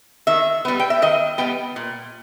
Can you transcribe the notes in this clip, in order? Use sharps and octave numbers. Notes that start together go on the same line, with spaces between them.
D#3 E5
G3 B3
G5
E5
D#3 D#5
G3 B3 G5
A#2